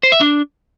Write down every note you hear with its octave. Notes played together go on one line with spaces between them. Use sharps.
C5
E5
D4